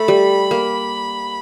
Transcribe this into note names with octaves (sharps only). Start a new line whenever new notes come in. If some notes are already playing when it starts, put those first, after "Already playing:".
Already playing: A3 B5
G3
A#3